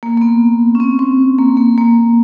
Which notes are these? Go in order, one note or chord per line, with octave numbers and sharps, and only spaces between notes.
A#3
A#3
B3
C#4
C4
C4
A#3
A#3
A#3